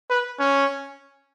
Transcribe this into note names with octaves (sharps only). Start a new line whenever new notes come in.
B4
C#4